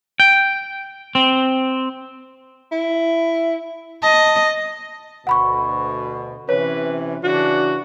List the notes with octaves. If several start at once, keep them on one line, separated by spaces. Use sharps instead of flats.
G5
C4
E4
D#5 A5
D2 B2 F#5 B5 C#6
C3 E3 C#4 B4 C#5
C#3 E3 D4 F#4